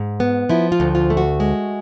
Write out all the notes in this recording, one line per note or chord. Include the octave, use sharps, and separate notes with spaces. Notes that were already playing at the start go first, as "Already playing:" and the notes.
Already playing: G#2
B3
F3 E4
F4
D2
F4
A3
F#4
G#3